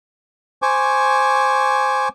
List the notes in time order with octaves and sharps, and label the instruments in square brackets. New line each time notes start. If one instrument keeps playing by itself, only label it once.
[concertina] C5 G#5 C#6 D6